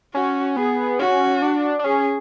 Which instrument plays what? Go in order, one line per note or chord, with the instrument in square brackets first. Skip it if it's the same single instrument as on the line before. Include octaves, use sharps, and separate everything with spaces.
[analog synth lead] C#4 [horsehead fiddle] F#4
[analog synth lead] B3 [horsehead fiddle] G#4
[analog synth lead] C#4 [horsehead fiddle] F#4
[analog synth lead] D4
D4
[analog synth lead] C#4 [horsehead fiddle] G#4